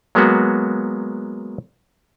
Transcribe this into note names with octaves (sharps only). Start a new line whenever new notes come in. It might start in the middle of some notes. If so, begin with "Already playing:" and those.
F#3 G#3 A#3 B3 F#4